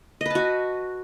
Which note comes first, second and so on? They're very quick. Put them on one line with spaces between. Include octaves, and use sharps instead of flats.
D#5 B4 A5 F#4